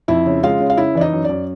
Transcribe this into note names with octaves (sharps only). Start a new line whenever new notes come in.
F2 E4 E5
C#3
G#3 F4 F5
C#3
F5
C#3 E4 E5
E3 D5
D#4 D#5
F#2
F#2 D5